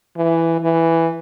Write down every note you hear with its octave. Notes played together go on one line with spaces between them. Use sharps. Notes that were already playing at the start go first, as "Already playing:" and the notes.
E3
E3